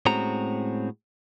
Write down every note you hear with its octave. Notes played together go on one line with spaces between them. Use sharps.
A2 G#3 C4 C#4 F#4 A#5